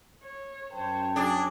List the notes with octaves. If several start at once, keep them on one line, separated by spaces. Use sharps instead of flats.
C#5
F#2 C5 C#5 G5 A5
F#3 D4 G#4